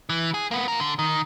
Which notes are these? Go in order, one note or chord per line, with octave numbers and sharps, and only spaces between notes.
E3
G#4
A#3 B3
F4 A#4
D3
D#3